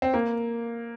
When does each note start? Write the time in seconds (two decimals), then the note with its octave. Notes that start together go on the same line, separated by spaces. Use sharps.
0.02 C4
0.14 A#3